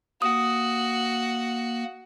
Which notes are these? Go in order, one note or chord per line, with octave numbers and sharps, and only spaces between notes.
A#3 F#4 D#6